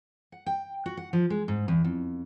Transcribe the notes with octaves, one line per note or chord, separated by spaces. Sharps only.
F#5
G5
F#4
F#5
F3
G#3
G#2
E2
F2